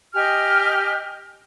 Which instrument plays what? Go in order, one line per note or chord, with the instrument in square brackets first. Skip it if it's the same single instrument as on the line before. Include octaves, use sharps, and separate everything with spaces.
[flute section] G4 D#5 G#5 F6